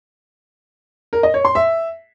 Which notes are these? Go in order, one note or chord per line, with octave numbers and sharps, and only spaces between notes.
A#4
D#5
C#5
C6
E5